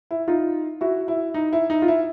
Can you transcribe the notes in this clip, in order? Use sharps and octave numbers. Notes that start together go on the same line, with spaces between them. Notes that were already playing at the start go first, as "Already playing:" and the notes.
E4
D#4 F4
E4 F#4
E4
D#4
E4
D#4
F4
E4